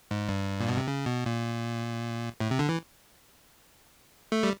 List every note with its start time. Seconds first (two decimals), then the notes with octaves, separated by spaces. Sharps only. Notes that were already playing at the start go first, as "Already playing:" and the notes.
0.11 G#2
0.29 G2
0.60 A#2
0.68 B2
0.77 C3
0.88 C#3
1.06 B2
1.26 A#2
2.40 A2
2.51 C3
2.59 D3
2.69 E3
4.32 A3
4.43 G3